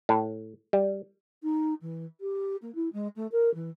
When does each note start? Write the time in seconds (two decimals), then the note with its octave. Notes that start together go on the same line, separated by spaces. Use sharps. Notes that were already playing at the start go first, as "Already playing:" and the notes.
0.09 A2
0.73 G3
1.43 D#4
1.81 E3
2.21 G4
2.62 A#3
2.75 E4
2.93 G#3
3.16 A3
3.32 A#4
3.54 E3